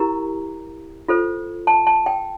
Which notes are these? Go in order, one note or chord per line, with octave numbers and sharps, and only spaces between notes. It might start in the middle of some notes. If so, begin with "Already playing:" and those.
Already playing: E4 G4 A#4 A#5
F4 A4 C5
A5
A5
G5